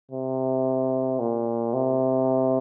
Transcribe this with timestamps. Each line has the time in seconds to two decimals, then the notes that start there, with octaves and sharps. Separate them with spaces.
0.12 C3
1.20 A#2
1.74 C3